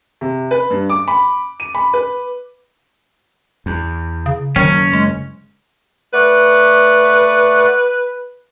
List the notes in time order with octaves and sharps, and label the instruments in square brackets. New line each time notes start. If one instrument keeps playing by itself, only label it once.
[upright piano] C3
B4
G2
D6
B5
D#7
B5
B4
[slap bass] E2
[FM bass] C#3
[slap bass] F#1 [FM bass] D#3 [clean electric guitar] C#4
[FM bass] G#3
[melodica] A3 D5 F#5 [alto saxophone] B4